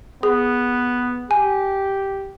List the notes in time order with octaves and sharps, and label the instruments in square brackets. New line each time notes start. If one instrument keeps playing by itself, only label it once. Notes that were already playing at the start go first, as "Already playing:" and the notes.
[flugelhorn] B3 [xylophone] G#4
[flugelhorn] G4 [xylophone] G#5